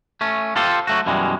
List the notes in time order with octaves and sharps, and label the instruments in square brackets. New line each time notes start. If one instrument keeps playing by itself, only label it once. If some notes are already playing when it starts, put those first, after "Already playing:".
[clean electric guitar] A3 C#4
F4 G4 A4 C5
F#3 A3 F#4
F#2 B2 E3 G3 G#3